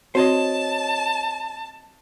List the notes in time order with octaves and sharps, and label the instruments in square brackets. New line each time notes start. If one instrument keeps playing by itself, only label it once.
[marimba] C4 F#4 [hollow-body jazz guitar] C5 C#5 D#5 [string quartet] A5